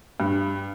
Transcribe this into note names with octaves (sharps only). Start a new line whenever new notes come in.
G2